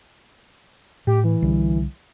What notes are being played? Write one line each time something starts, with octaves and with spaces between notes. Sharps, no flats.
A2 G4
E3
C2 D3 G3